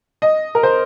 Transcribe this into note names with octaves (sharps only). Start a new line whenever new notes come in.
D#5
A#4
C5